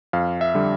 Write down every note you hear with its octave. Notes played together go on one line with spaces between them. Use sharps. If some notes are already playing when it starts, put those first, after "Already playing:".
F2 F5
E5
D3 G3